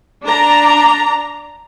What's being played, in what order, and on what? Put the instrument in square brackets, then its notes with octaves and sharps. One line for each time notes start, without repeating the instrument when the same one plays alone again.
[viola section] D4 A#5